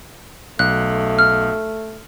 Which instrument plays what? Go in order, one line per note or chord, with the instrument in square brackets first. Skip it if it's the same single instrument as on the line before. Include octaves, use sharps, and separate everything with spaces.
[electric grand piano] B1 [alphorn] A3 [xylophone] F#6
[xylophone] F6